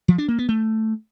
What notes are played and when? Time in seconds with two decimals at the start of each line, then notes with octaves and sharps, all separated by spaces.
0.08 F3
0.18 D4
0.28 A#3
0.39 B3
0.49 A3